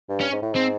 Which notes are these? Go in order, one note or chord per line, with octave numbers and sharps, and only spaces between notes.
G2
C#4
G#2
A2
G#2 C4